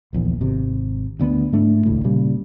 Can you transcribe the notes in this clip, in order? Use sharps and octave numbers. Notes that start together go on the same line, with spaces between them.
D1 A#1 E2
G#1 C3
D2 D3 B3
G#2 A3 D4
D#1 G#1 C#2 A2
A#2 C#3 G3